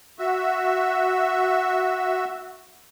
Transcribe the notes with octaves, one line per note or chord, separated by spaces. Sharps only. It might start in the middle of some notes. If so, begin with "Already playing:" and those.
F#4 E5